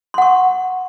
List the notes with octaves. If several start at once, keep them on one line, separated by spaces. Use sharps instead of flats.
F#5 C6 C#6